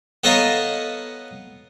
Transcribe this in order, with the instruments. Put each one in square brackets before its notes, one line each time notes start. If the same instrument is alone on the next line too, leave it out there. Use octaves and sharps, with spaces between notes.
[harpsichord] B3 A4 C#5 D#5 F5 A#5